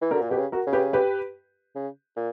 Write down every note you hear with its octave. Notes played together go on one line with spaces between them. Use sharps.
E3
D3 F#4 A#4
A#2
B2 G4 B4
C#3
F#4 A#4
C#3
G4 B4
G4 B4
C#3
A#2